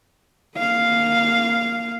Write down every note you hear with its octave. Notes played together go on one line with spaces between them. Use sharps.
A#3 F5